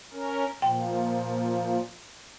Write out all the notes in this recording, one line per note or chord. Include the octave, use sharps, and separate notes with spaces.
C#4 A#4
A#2 F3 G5